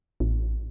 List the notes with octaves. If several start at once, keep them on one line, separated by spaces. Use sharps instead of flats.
A1